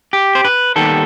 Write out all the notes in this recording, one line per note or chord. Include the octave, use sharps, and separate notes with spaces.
G4
C5
B4
D#2 D#3 G3 B3 A4